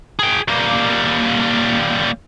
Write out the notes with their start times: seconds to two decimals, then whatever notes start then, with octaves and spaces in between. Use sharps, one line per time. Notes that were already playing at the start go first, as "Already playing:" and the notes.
0.19 G#4 G5
0.48 G3 A#3